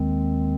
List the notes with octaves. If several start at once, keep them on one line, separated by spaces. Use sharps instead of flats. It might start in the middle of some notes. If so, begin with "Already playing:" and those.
Already playing: D#2 D#3 G#3 C4